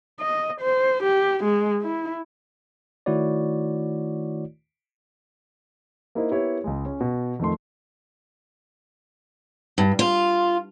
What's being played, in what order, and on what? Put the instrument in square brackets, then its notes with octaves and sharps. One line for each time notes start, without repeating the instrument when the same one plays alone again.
[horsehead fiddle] D#5
C5
G4
G#3
E4
[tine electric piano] D#3 A3 E4 F#4 C#5 D5
[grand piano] A#3 D#4 E4 A#4 C5 D#5
B3 E4 G4 A#4 C#5
C#2 G#3
C#4
B2
F2 D#3 A3 C6
[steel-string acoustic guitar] G2
F4